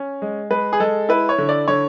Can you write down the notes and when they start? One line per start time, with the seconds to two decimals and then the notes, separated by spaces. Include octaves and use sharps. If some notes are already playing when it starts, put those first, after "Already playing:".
Already playing: C#4
0.22 G#3
0.50 G#3 B4
0.73 G#4
0.80 G#3 A4
1.09 E4 B4
1.29 C#5
1.38 D3
1.49 D5
1.68 D3 C#5